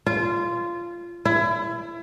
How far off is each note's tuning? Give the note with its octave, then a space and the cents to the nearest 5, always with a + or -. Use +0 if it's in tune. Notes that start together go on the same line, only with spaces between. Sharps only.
F4 -15
E4 +30